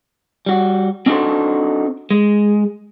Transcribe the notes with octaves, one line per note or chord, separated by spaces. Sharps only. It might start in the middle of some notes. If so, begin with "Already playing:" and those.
G3 F#4
C4 D4 D#4 F#4 A4 C5
G#3